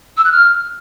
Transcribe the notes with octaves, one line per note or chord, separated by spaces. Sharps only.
E6
F#6
F6